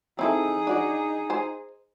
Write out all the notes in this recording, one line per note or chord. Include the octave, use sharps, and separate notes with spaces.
C4 D#4 E4 G#4 A4
D4 F#4 D5
C5 G#5